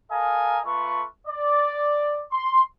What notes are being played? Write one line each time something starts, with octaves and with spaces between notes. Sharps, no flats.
A4 A#4 D#5 F5 G#5 A#5
A3 F4 A4 B4 C#6
D5
C6